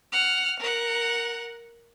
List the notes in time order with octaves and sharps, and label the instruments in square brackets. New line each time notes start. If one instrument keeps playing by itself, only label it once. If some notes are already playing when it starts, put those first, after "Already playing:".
[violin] F#5 F6
A#4 F#5